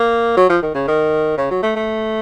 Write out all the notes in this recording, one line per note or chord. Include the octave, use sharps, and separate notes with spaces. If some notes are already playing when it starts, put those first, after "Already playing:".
Already playing: A#3
F#3
F3
D#3
C#3
D#3
C#3
F#3
A3
A3